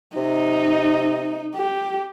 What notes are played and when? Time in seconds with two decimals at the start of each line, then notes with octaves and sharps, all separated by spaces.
0.16 C3 D#4
1.55 G4